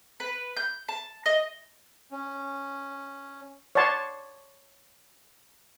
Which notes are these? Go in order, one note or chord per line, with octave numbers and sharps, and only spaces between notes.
B4
G6
A5
D#5
C#4
C#5 D5 F#5 A5 C6